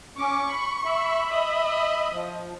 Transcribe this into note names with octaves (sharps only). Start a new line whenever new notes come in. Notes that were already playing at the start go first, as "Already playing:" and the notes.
C#4 C#6 D6
B5
E5 B5
D#5
F3